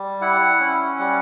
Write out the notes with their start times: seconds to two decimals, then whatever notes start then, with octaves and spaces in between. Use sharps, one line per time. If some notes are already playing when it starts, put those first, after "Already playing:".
Already playing: G3
0.21 E4 F#5
0.60 C#4
0.99 G3 F#5